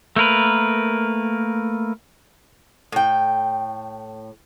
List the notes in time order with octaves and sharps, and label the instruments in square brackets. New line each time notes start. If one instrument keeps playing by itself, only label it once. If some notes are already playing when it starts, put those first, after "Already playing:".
[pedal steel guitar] A3 A#3 A#4 B4
[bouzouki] A2 G5